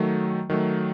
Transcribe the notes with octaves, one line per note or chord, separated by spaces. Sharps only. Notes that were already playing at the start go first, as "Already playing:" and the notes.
Already playing: D#3 F#3 A3
D#3 F#3 A3